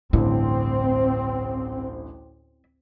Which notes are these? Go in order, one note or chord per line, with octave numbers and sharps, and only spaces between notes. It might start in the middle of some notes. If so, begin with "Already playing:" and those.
A1 D2 G2 C4 E4